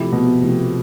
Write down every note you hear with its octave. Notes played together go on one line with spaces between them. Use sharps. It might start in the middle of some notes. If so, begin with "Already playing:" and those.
Already playing: C3 F3 A3 E4 G4
B2
C3 F3 A3 E4 G4